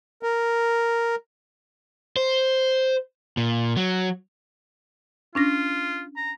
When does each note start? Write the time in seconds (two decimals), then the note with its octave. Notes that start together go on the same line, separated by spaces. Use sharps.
0.23 A#4
2.16 C5
3.37 A#2
3.77 F#3
5.35 C#4 D4 F4 A#6
6.16 A#5